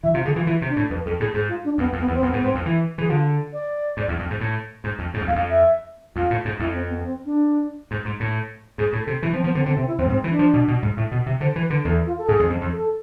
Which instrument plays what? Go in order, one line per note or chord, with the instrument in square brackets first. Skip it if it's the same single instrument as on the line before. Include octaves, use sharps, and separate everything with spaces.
[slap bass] E3 [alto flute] E5
[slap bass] C3 [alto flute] F4
[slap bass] D3 [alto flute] G#4
[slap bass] E3 [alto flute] F4
[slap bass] E3 [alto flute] E4
[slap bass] C3
[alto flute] D4
[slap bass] A2
[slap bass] F2 [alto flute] B4
[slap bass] F2 [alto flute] A4
[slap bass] A2 [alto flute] G#4
[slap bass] G#2 [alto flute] G#4
[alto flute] F4
D4
[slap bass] F2 [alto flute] B3
[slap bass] F2
[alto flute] B3
[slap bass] E2
[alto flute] C4
[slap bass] F2 [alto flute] B3
[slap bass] G#2 [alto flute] B3
[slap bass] G#2 [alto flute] C4
[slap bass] F2
[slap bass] E3 [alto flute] E4
[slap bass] E3 [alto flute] G#4
[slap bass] D3 [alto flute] F4
[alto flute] D5
[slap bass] G#2
E2
F2
G#2
A2
G#2
F2
G#2
F2
[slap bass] E2 [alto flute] F5
[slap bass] F2
[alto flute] E5
[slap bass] F2 [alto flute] F4
[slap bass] A2
G#2
[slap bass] F2 [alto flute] E4
[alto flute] C4
B3
C4
D4
[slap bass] G#2
G#2
A2
[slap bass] G#2 [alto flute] G#4
[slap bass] A2
[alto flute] A4
[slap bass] C3
[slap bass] E3 [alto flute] E4
[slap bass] F3 [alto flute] C4
[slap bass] F3 [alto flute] B3
[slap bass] D3 [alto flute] C4
[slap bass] D3 [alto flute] C4
[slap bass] C3 [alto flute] C4
[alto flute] E4
[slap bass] F2 [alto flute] C4
[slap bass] G#2 [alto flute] C4
[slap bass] E3
[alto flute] D4
[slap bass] F3
B2
B2
G#2
A2
B2
C3
[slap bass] D3 [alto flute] C5
[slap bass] E3
[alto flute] B4
[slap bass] D3
[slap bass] E2 [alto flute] A4
[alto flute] F4
A4
[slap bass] G#2 [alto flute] G#4
[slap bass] F2
F2
F2
[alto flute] A4